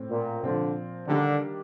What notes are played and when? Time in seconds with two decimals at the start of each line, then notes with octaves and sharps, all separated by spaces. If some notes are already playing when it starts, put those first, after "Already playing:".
Already playing: A2 A3 C4
0.10 A#2
0.43 A#2 D3 F3 C4 F4
1.07 D3 D#3 G3 A#3 D4 G4